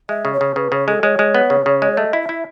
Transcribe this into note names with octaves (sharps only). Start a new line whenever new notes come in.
G#3 E5
C#3
C#5
C#3
C#3 B4
C#3 C#5
G#3 A4
G#3 C#5
G#3
B3
C#3
C#3
G#3
C#5
A3 D#5
E4
E5
E4